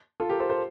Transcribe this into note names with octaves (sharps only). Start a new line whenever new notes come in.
F4 A4
G4 A#4
A4 C5
A4 C5